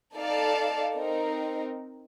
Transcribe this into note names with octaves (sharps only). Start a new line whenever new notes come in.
D#4 A4 D5 F5 A5
C4 D#4 A#4